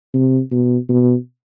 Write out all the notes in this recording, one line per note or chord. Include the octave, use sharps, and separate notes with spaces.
C3
B2
B2